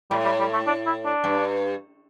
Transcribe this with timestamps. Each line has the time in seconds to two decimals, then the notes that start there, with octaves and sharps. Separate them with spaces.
0.11 A2 G3
0.25 G3
0.39 G3
0.53 A3
0.67 D4
0.86 E4
1.05 D4
1.24 G2